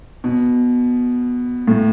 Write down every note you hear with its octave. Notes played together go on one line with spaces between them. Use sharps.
B2
A2